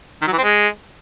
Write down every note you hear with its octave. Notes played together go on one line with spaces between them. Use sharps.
D#3
F#3
E3
C4
G#3